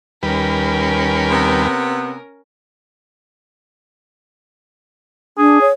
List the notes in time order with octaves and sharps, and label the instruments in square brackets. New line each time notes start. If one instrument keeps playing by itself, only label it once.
[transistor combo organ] D#2 G3 B4 [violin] C#4 A#4
[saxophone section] C3 B3
[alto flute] D4 [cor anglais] G#4
[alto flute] C#5